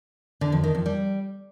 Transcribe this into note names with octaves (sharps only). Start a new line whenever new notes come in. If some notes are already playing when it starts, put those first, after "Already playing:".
D3
F2
D#3
F2
G3